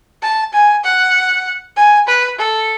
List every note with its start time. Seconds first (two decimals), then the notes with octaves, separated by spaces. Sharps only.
0.22 A5
0.53 G#5
0.84 F#5
1.76 G#5
2.07 B4
2.38 A4